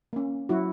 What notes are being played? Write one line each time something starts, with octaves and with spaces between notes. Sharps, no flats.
A#3 C#4
F#3 E4 F#4